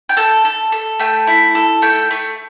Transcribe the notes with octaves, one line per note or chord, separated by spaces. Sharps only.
G5
A4 A5
A4
A4
A3 G5
E4
A4
A3 G5
A3